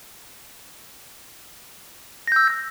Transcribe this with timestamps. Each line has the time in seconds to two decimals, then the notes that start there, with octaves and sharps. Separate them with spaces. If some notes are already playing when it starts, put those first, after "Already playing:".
2.28 A#6
2.32 G6
2.36 E6